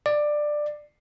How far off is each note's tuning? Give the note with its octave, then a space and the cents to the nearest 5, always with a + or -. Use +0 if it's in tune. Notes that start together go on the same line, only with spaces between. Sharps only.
D5 +15